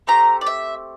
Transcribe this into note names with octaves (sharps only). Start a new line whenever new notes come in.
A3 C4 G4 A#5
D5
E5